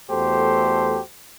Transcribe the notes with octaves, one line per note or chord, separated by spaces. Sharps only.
E2 A3 F#4 G4 A4 C5